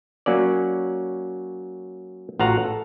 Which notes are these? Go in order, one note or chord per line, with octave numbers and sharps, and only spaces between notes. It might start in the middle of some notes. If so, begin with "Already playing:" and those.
F#3 A#3 C#4 D5
A1 F4 F#4 F5 F#5 A#5
A4